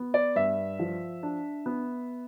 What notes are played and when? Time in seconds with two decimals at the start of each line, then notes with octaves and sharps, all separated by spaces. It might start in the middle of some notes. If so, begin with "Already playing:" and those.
Already playing: B3
0.14 D5
0.36 G2 E5
0.79 F3
1.23 D4
1.66 B3